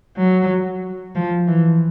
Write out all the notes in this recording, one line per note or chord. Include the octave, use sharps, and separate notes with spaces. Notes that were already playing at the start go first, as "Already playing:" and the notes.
F#3
F3
E3